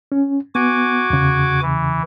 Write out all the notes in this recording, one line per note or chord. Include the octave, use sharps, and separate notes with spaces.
C#4
B3 F#4 G#5 D6
E2 C#3
E3